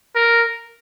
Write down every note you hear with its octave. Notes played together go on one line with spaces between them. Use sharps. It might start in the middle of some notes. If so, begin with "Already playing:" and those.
A#4